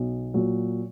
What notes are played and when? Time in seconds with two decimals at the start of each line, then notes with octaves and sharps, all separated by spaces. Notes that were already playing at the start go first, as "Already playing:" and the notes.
Already playing: B1
0.34 A#2 F#3